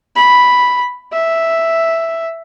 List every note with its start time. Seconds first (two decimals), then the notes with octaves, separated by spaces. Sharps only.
0.16 B5
1.12 E5